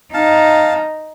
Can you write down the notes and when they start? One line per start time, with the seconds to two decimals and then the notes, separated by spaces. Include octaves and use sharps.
0.14 D#4 F5 A5